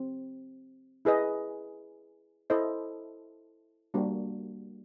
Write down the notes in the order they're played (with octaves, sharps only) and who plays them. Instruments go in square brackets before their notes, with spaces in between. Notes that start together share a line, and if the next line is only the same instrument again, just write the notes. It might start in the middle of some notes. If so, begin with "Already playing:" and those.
Already playing: [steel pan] C4
E4 G#4 B4 D#5
E4 A4 C5 D#5
G3 A#3 D4 F#4